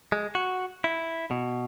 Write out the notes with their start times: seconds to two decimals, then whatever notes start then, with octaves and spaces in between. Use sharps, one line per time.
0.12 G#3
0.35 F#4
0.84 E4
1.31 B2